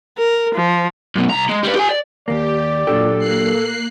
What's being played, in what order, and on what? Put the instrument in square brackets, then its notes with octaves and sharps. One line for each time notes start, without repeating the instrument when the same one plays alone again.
[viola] A#4
F3
[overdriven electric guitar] F#2 B2
C2 A#5
G#3
G3 B4
G4 G#5
D5
[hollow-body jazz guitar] D#2 A#3 [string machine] G4 [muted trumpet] D5
[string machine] A#2 [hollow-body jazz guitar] F#3 D4 G4 [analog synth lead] A4
[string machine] A#3 F#6 C7